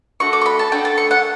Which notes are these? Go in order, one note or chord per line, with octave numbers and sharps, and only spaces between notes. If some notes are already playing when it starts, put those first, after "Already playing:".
A3 D4 F#4 A4 C#6
D6
C#6
B5
A5
A3 D4 F#4 A4 G5
A5
C#6
F#5